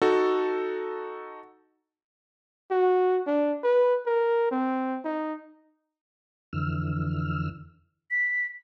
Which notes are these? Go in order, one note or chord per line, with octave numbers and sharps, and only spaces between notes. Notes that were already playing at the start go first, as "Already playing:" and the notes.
D#4 F#4 A4
F#4
D4
B4
A#4
C4
D#4
F2 D3 E3 E6 F6
B6